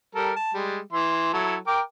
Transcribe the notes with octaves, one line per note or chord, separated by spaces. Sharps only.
G3 A4 A#4
A5
G3 G#3
E3 E5 C6
F#3 E4 A4
A#4 G5 D6